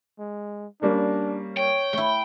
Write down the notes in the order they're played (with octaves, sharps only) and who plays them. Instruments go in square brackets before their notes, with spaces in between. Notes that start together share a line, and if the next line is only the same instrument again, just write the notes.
[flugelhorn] G#3
[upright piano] G3 A#3 C#4 [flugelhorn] D4
[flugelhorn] C#5 [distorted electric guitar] G5
[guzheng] A3 E4 [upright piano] G7